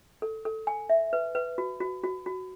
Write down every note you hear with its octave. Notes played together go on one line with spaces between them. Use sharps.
A4
A4
G#5
E5
B4
B4
F#4
F#4
F#4
F#4